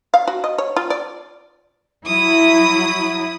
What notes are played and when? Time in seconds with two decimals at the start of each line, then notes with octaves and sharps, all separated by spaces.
0.14 F5
0.28 F#4
0.44 D#5
0.58 C#5
0.76 F4
0.90 D5
2.07 F#3 E4 D#6